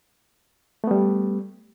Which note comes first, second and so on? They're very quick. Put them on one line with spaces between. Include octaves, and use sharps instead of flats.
A3 B3 G3